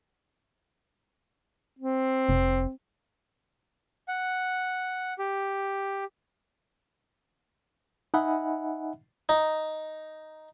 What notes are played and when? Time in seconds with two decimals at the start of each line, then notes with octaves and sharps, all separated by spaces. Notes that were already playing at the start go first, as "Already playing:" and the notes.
1.79 C4
2.28 F1
4.08 F#5
5.19 G4
8.14 D#4 D#5 E5 F#5 G#5 B5
9.29 D#4